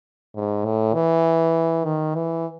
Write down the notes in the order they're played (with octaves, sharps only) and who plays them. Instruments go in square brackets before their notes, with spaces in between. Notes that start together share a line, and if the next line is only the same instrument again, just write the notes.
[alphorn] G#2
A2
E3
D#3
E3